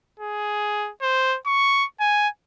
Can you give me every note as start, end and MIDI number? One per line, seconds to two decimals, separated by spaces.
0.19 0.91 68
1.02 1.38 72
1.46 1.85 85
2.00 2.28 80